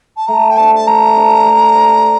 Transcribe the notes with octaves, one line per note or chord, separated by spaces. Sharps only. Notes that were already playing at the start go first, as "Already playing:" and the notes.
A5
A3 A#5
G5
D4 G4 C5 A5
A5
A3 A#5
D4 G4 C5
A3
D4 G4 C5